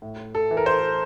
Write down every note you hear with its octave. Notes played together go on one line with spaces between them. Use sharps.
A2
A4
E3
A#4
C5